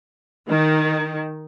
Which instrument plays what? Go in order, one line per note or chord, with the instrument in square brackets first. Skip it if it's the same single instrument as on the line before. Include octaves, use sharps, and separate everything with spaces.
[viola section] D#3